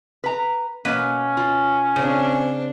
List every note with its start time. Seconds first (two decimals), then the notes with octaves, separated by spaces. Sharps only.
0.24 B4 A#5
0.85 B2 A#3 C#4 B4
1.37 F4
1.96 C#3 C4 D4